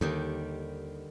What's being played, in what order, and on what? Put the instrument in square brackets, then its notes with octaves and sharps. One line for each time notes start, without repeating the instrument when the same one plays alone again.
[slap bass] D#2 [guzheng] D3 D#3 G3